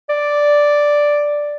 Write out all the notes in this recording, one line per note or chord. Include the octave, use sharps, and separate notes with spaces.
D5